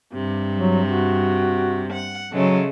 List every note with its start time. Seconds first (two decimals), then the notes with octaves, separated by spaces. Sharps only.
0.12 G2 C3
0.57 F#3
0.89 F#4
1.93 F#5
2.32 C#3 F#3 G#3 A3